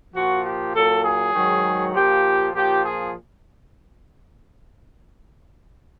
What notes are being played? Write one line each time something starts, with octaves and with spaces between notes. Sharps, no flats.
A#2 F3 F#4
G4
A#2 F#3 A4
G#4
G#2 D#3 F#3
A#2 F3 G4
A#2 F3 G4
G#4